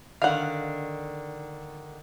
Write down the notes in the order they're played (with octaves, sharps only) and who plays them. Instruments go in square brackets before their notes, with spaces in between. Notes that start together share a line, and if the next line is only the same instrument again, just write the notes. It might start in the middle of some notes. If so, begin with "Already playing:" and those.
[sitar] D3 D#3 [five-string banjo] F5 F#5